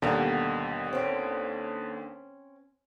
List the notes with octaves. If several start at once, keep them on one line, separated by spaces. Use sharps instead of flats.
D#2 B2 D3 G3 A#3
C4 C#4